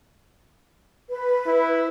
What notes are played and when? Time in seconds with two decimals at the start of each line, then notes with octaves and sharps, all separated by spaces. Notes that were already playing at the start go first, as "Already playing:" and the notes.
1.09 B4
1.46 E4